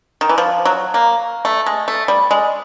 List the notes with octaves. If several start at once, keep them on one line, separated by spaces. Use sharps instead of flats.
D#3
E3
F3
F#3
A#3
A3
G#3
A3
G3
G#3